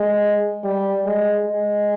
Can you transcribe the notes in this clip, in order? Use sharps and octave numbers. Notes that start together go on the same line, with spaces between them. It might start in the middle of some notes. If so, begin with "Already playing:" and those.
Already playing: G#3
G3
G#3
G#3